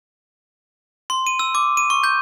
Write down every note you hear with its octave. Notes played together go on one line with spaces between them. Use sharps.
C6
D#7
E6
D6
D#7
C#6
G6